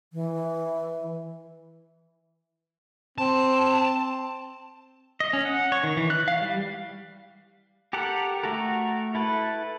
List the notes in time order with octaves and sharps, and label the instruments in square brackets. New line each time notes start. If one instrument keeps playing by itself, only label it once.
[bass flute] E3
[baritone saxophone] C4 [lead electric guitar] A5
[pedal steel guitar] D#5
C#4
F#5
C#5
D#3
E3
F#6
F5
G3
G4 A4 A#4 F#5
A3 F#4 A4 A#4
E4 A4 B4